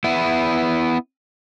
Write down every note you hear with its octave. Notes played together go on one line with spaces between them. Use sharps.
B3 E4